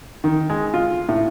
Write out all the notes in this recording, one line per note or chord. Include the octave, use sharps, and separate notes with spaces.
D#3
G#3
F4
A2